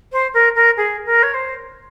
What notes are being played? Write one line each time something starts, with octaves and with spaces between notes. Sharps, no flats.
C5
A#4
A#4
G#4
A#4
C#5
C5